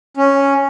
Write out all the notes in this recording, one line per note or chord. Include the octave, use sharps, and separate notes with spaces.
C#4